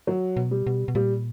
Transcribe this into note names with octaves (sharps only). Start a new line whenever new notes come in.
F#3
B2
G3
B2
B2
A#2 G3